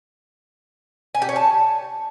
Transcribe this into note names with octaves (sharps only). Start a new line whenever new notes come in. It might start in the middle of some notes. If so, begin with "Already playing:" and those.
G#5
G4
C#5
A5